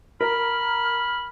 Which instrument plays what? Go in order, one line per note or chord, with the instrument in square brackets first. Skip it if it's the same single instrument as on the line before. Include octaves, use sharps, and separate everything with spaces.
[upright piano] A#4 [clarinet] B5 [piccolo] F6